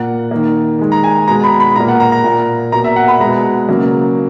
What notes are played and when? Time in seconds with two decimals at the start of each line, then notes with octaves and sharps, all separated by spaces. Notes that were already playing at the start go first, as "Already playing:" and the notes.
Already playing: A#2 A#3 F#5
0.31 D#3 A#3
0.79 D#3 G#3
0.92 A#5
1.04 G#5
1.28 B2 G#3 A#5
1.44 B5
1.60 B5
1.76 A#2 A#3 A#5
1.88 F#5
2.00 A#5
2.12 A#5
2.24 A#2 A#3
2.72 B2 A#3 A#5
2.84 E5
2.96 F#5
3.08 B5
3.20 B2 G#3 A#5
3.69 C#3 F#3 A#3